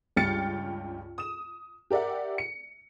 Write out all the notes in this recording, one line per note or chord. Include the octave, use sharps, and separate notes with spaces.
C#2 G2 G5 F6 A6 C#7
D#6 E7
G4 A#4 D5 E5 F#5
C#7